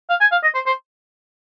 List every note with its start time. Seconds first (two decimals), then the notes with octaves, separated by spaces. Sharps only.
0.10 F5
0.21 G#5
0.32 F5
0.43 D#5
0.55 C5
0.67 C5